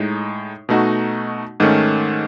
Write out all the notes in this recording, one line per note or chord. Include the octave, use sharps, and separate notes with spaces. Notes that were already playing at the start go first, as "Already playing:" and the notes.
Already playing: A2 G#3 D#4
B2 A3 D#4 F#4
G#2 D#3 A3 C#4